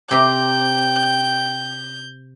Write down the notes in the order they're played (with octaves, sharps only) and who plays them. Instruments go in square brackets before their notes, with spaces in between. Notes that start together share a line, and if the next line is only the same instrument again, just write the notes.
[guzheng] C3 C4 [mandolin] G4 A#5 D6 [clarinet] G5 [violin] G6